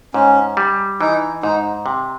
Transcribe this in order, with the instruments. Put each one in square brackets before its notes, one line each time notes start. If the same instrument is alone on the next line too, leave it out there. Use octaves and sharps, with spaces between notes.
[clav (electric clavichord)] G#2 [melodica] C#4
[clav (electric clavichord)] G3
[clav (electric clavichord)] E3 [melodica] D#4
[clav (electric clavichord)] G#2 [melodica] D#4
[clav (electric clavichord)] C3